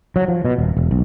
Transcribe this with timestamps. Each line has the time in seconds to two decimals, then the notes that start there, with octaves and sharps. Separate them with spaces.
0.16 F#3
0.28 F3
0.45 B2
0.58 D#1
0.77 E1
0.91 B1